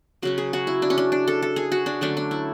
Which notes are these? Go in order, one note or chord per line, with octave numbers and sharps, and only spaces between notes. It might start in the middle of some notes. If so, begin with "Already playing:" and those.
C#3 F#3 C#4 F#4
G#4
F#4
E4
D4
C#4
D4
D4
A4
A4
G#4
F#4
D4
D3 F#3 A3 C#4 D4
D4
E4